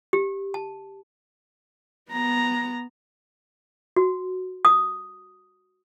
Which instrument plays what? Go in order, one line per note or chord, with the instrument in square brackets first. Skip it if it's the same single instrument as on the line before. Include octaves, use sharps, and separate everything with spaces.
[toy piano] G4
A5
[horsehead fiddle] B3 A#5
[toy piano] F#4
D#6